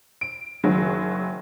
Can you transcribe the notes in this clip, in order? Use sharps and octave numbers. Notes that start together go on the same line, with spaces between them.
D7
F#1 D#3 F#3 G#4